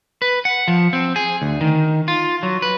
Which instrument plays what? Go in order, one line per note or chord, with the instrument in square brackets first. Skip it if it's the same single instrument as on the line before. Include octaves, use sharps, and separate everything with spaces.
[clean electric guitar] B4
F#5
F3
C4
G#4
D2
D#3
F4
F#3
B4